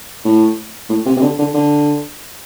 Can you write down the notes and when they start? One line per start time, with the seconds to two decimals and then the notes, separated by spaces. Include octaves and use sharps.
0.25 A2
0.89 A2
1.06 C3
1.17 C3
1.22 D3
1.39 D3
1.54 D3